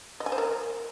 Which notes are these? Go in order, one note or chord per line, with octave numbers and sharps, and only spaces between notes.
D#5
G#5
C5
A#4